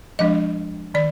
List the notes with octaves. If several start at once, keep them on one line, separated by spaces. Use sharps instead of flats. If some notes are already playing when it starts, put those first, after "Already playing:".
F3 G#3 D4 D#5
D#3 D5